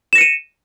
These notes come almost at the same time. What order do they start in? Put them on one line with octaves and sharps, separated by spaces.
E7 A#6 C#7 D#7